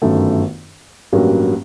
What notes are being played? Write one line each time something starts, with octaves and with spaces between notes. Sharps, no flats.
G1 F#2 D#3 A3
A1 G2 F#3 A#3